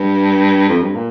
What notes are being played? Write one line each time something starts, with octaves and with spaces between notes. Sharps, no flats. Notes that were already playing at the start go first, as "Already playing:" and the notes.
Already playing: G2
F2
G2
A#2